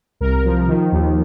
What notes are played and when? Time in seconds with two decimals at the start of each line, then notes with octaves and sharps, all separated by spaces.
0.20 C2 A#4
0.45 F3
0.68 D#3
0.92 D#2